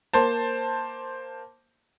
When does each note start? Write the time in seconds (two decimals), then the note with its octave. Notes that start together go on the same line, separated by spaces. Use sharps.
0.13 A#3 C5 A5